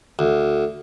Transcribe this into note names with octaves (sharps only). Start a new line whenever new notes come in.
D2